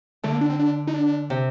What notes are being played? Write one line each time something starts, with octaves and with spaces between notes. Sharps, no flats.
D3 A3
A#3
D4
C4
D4
D#4
D4
C3